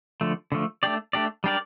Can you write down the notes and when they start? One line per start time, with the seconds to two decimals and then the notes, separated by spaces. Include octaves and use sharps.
0.21 D3 F3 A3
0.52 D3 F3 A3
0.83 A3 D4 G4 D5
1.13 A3 D4 G4 D5
1.44 G3 D4 G4 A#4 D5